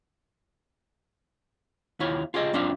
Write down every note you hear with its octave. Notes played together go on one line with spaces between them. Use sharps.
D#2 E4 F4 C#5
F4 G4 G#4 A#4 D#5
F#2 C4 D4 F4 E5 F5